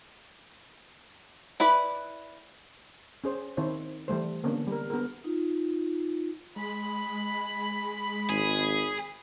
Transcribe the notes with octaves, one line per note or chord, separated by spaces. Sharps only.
E4 B4 D5 B5
C#4 G#4 C5
D#3 C4 E4 C5 C#5
E3 G3 A3 C5
D3 A#3 B3 C#4 D4
G3 A#4
B3 D4 F#4 G#4 A#4
D#4 F4
G#3 B5
G#1 G#4